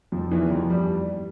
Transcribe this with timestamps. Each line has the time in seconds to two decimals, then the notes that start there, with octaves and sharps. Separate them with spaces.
0.12 F2 F3
0.31 E2 E3
0.50 F2 F3
0.70 G2 G3